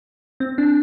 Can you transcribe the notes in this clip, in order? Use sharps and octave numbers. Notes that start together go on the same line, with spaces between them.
C4
D4